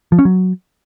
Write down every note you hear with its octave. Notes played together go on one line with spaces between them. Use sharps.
F3
C#4
F#3